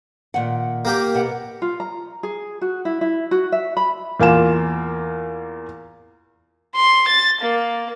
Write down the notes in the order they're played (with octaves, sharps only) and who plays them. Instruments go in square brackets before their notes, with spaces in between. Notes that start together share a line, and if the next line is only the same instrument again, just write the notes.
[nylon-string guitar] A#2 D#3 F#5
[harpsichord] A#3 G4
[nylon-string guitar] B2 F#5
[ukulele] F4
A#5
G#4
F#4
E4
E4
F#4
E5
B5
[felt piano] E2 A#3 F4 G#5 E7
[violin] C6
A6
A#3